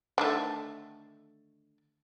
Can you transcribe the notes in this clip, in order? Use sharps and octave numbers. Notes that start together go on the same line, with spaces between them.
D3 D#3 A3